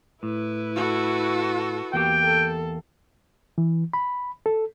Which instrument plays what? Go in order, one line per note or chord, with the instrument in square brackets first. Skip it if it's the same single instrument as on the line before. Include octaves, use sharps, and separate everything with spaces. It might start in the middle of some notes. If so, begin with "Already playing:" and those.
[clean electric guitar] A2 [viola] E4 B4
[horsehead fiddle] F#4 A4
[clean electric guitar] E2 A#3 G4 [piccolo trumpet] G5
[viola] A4
[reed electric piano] E3
B5
A4